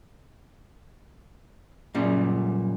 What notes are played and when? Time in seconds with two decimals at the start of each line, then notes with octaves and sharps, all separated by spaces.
1.95 F#2 A#2 C#3 G3